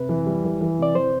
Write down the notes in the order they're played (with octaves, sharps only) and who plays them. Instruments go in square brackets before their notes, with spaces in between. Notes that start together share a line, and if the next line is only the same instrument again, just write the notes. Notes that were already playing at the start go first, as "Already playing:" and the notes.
Already playing: [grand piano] C3 [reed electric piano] B4
[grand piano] E3
G3
E3
E3
[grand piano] C3 [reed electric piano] D5
[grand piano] E3 [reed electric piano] C5